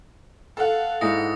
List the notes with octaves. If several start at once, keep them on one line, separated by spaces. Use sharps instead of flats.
A4 F5 F#5
G#2 E4 D#6 A#6 C#7